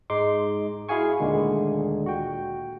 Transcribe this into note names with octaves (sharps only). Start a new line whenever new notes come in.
G#2 G#3 D#4 C6 D6
E4 F#4 G#4 F5 G#5 C#6
D2 A#2 D3 D#3 G#3
F#4 G5